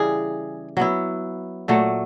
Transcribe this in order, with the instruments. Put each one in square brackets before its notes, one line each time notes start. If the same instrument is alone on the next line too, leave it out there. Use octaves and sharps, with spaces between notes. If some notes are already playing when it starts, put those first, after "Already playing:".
Already playing: [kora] C#3 E3 G3 [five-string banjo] G#4
[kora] F#3 B3 E4
A#2 F#3 A3